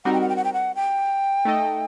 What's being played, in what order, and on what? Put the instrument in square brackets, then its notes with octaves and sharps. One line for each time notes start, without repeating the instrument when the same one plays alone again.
[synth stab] G3 C4 D#4 F#4 A#4 [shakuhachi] F#5
[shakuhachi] G5
F#5
G5
F#5
G5
F#5
G5
[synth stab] A3 D#4 A4 D#5